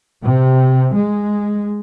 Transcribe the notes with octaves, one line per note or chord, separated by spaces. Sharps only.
C3
G#3